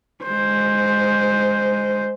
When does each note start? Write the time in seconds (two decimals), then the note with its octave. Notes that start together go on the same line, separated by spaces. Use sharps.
0.24 G#3 C5